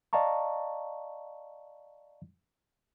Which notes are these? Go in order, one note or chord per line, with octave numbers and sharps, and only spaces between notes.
D5 D#5 F5 A5 A#5 C#6